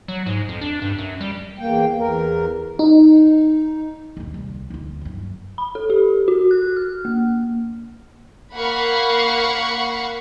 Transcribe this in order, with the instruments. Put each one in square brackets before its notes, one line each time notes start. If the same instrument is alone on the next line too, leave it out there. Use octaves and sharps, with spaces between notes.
[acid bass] F#3
G#2
F2
D4
G2
F#2
G3
[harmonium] E2 A#3 G5
E2 A#4
[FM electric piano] D#4
[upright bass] A1 D#2
C2
D2 F4
G1 F#2
[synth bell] B5
A4
G4
F#4
F#6
F6
A#3
[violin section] A#3 F5 F#5 B5 C#6